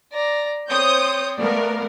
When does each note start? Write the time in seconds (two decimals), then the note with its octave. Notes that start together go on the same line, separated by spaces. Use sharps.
0.12 D5 A#5
0.69 C4 C5 C#5 D#6 G6
1.37 A3 B3 A#4 D5 F5